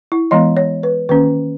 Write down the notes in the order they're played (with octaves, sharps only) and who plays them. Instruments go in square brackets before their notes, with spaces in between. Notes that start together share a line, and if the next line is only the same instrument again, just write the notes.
[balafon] E4
E3 G#3 B3 D#5
C#5
B4
D#3 A#3 C#4 B4